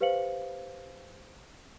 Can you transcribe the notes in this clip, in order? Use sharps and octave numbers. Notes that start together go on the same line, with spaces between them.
G4 B4 C5 F5 C#7 F#7